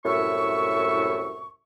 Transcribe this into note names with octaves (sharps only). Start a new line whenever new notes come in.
C2 F#2 A2 E5 C#6